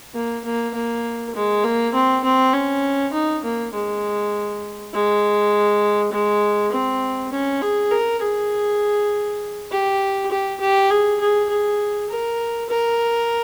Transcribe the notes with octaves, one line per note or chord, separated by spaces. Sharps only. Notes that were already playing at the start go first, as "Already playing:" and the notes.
A#3
A#3
A#3
G#3
A#3
C4
C4
C#4
D#4
A#3
G#3
G#3
G#3
C4
C#4
G#4
A#4
G#4
G4
G4
G4
G#4
G#4
G#4
A#4
A#4